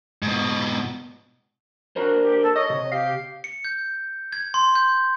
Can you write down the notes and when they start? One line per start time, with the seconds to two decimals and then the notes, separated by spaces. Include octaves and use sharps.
0.22 G#2 B2
1.96 D4 F#4 A#4 C5
2.22 G4
2.42 A4
2.56 C#5 D#5
2.70 C3
2.91 G4 F5
3.44 C#7
3.65 G6
4.33 G#6
4.54 C6
4.75 G6